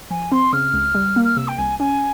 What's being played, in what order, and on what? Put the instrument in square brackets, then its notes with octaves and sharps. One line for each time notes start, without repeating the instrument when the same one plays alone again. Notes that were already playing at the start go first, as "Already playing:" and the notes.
[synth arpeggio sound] F3 [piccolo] G#5
[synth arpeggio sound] C4 [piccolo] C6
[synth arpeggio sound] C#3 [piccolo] F6
[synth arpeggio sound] C#2
G3
A#3
[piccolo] F6
[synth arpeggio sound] C3 [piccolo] E6
[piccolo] G5
[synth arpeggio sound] C2 [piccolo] G#5
[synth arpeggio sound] C#4 [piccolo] G#5